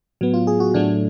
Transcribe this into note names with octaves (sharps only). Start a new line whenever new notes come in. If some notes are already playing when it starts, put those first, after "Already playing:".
A2 F#3 B3
F4
G#4
F#4
A2 F#3 A3 D4